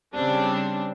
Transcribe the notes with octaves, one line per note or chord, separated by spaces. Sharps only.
C#3 G3 C4 D4